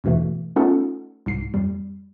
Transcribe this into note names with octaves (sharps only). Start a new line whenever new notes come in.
E2 G2 B2 E3 A3
A3 B3 C#4 D#4 F4 A4
C2 G#2 C7
F2 G3